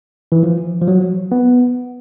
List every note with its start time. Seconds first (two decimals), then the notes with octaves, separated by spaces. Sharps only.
0.32 E3
0.43 F3
0.81 F3
0.88 F#3
1.32 B3